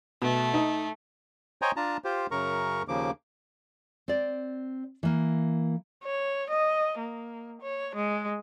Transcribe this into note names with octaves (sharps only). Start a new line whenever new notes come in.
B2 A3
D#4
C5 C#5 D#5 G5 G#5 A#5
D4 F4 A5 A#5
F4 G4 C5
F#2 C#3 A#4 A#5 C#6
D#2 C#3 F3 A#3 D6
C4 D5
E3 A#3
C#5
D#5
A#3
C#5
G#3